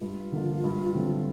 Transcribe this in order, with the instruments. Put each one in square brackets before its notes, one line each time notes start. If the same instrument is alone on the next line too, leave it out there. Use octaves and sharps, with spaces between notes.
[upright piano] G2 [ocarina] F4
[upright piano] D3 F3 A#3 D4
G2
D3 F#3 A3 C4